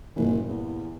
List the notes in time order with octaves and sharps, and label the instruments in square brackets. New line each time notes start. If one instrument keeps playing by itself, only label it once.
[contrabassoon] F#1 [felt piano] G2 A#2 E3
[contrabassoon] E2